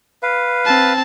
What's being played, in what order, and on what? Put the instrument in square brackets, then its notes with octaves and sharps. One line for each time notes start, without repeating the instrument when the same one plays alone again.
[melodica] B4 F5
[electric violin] C4 A5